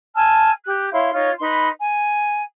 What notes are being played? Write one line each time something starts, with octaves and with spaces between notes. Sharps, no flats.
G#5 A5 E6 F6
G4 F#6
E4 C#5 F5 C6
D#4 F4 C#5
D#4 B4 B5 C6
G#5